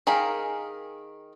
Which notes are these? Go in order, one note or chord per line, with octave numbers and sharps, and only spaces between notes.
D#3 G#4 A#4 F5 B5